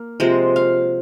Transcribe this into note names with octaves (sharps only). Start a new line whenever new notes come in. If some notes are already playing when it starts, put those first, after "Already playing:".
Already playing: A#3
C3 F3 G#3 C5
F5